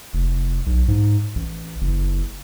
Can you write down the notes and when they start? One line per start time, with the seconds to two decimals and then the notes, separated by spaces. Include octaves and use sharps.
0.13 F1
0.66 B1
0.88 G#2
1.35 A1
1.81 F#1